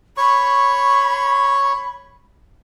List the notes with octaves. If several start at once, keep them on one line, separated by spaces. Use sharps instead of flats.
C#5 B5 C#6